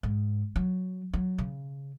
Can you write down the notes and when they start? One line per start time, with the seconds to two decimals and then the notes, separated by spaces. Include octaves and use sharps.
0.03 G#2
0.56 F#3
1.13 F#3
1.38 C#3